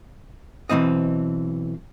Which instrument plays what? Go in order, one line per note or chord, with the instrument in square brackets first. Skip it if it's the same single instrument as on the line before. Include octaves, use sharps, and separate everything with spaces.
[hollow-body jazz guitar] B1 C#3 E3 C4 D#5